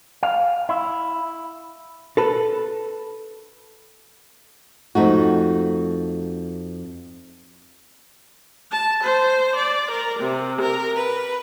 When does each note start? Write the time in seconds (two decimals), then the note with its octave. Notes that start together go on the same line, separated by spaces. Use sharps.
0.23 F5
0.69 E4
2.17 A4 B4
4.95 F2 A3 D#4 F#4
8.71 A5
9.04 C5
9.55 D5
9.90 A#4
10.19 C3
10.61 A#4
10.95 B4